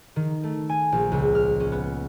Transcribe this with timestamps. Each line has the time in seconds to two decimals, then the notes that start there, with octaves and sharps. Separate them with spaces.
0.16 D#3
0.44 A3
0.69 G#5
0.92 A#1
1.12 C#2
1.35 F6
1.60 C#4
1.72 B3